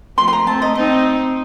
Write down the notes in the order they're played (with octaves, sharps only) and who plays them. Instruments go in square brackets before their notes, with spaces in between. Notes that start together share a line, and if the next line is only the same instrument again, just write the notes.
[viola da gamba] F3 A3 [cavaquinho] C6
[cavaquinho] C6
A#5
[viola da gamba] A3 C4 [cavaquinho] A5
[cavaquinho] D#5
[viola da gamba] C4 D#4 [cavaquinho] D#5